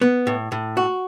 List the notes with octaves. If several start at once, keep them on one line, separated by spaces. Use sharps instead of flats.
B3
A2
A2
F#4